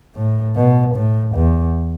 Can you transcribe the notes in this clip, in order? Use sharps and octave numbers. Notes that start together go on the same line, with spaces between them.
A2
B2
A2
E2